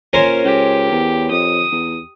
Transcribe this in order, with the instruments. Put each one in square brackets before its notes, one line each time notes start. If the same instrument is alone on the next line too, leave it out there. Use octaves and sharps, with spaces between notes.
[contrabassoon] A#2 [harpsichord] C#4 A#4 C5
[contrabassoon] C#2 [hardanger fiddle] G4
[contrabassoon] E2
[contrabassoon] F2 [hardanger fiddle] D#6
[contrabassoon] E2